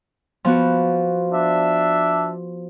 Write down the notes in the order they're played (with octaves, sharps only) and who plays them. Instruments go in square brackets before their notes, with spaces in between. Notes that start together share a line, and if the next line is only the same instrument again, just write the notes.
[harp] F3 B3 F#4
[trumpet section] D4 E5